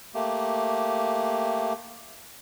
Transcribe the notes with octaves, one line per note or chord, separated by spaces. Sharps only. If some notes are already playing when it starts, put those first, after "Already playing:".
A3 A#3 G4